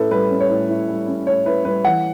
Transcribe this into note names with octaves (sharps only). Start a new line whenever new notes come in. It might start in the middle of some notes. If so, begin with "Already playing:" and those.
Already playing: A2 C#4 E4 A4 B4
G3 B4
C#4
C#5
A2
E4
G3
C#4
A2 C#5
E4 B4
G3 B4
E3 F#5